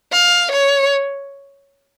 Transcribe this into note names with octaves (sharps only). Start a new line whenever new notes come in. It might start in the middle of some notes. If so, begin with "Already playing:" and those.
F5
C#5